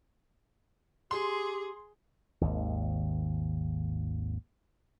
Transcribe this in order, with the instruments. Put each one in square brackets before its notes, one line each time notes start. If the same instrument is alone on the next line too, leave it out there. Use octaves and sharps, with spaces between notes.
[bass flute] G4 [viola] G#4 [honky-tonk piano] C6
[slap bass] G#1 D#2